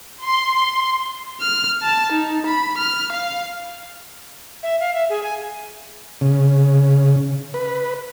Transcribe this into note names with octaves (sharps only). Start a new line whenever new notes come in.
C6
C6
F6
A5
D#4
B5
F6
F5
E5
F5
E5
G#4
G#5
C#3
B4